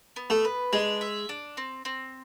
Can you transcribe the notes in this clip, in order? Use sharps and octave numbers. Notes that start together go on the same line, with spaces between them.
B3
A3
B4
G#3 D4
E5
D4
C4
C4